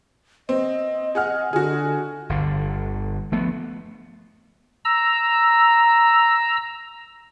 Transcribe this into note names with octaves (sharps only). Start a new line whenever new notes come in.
C4 D#5
G#4 F#5 F6
D3 F#4 G#4
G1 D3
F3 A3 B3
A#5 E6